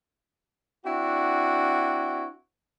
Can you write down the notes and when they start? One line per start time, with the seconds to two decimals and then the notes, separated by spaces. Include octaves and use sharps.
0.85 C4 D4 E4 F#4